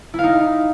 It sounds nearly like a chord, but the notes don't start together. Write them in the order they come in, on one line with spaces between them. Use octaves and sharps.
E4 F5 D#4